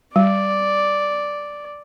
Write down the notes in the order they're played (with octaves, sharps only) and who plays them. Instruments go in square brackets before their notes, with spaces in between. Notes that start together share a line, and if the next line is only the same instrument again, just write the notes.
[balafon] G3 [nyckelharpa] D5